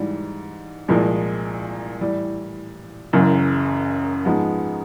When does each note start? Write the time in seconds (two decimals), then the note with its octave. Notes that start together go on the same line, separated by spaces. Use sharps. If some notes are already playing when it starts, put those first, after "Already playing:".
Already playing: G#2 E3 G3
0.88 C2 A#2 F3 G#3
2.01 A2 E3 G3
3.13 F#1 F#2 C#3 E3
4.25 G#2 F3 G#3 B3